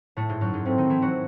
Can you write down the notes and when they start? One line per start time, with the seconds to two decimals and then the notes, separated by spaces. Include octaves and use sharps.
0.16 A2 A3
0.29 G#2 G#3
0.41 F#2 F#3
0.53 G#2 G#3
0.65 A2 A3 C4
0.78 D#3 D#4
0.89 E3 E4
1.02 F#3 F#4